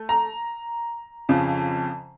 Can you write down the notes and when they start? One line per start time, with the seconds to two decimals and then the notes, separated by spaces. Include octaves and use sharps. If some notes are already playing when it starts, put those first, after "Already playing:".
Already playing: A3
0.09 A#5
1.29 F2 C#3 F3